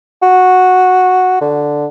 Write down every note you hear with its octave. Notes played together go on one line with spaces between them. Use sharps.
F#4
D3